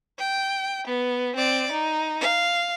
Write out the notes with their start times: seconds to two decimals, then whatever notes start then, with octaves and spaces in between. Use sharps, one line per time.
0.19 G5
0.87 B3
1.36 C4 D5
1.72 D#4
2.21 F5